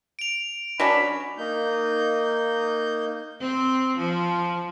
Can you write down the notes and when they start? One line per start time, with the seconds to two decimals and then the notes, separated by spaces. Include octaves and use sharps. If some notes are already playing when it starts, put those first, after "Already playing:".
0.19 D7 F7
0.80 F#3 C#4 D4 B5
1.38 A#3 D#4 G6
3.41 C4
3.98 F3